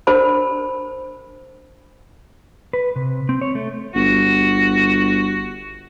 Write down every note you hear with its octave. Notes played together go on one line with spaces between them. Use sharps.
D4 A#4 C5 A5 B5
B4
C3
C4
C#5
A3
G1 F#4